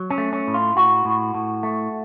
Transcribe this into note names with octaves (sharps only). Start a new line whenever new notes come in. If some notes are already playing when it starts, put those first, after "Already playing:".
Already playing: F#3
C#4
A3
C#4
A2
F4
A2 F#4
A2
A2
A3